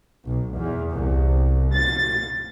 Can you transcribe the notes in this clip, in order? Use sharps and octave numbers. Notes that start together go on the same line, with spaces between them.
B1
E2
C2
A6